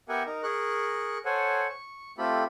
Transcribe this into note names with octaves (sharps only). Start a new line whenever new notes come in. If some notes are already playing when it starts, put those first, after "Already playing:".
B3 G4 A#4 E5 F#5 G#5
D#4 A#4
G#4 A#4 C#6 F#6
A4 C5 C#5 F#5 G#5
C#6
A3 C4 F4 G4 A4 B5